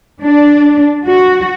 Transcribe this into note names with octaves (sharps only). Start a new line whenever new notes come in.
D4
F#4